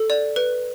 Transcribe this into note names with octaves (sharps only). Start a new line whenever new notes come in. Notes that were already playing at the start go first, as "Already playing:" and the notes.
Already playing: A4
D5
B4